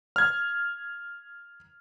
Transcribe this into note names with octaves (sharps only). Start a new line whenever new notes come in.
F6 G#6